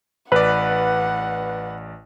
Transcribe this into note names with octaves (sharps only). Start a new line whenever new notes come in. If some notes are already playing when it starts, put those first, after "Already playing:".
A1 B4 D5 F#5